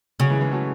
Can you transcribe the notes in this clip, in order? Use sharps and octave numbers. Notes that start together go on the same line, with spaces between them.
C#3 F#3
E3 G#3
E3 G#3
F#3 A3